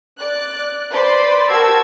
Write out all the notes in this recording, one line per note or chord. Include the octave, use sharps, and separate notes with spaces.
D5 F#6
B4 C5 D5 B5 C6
F#4 G4 A#4 A5 E6 G#6